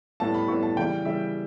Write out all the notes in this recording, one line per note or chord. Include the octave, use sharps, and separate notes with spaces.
A2 G3 B3 A5
B5
A2 G3 B3 C#6
A5
C#3 E3 G3 G5
C#3 E3 G3 E5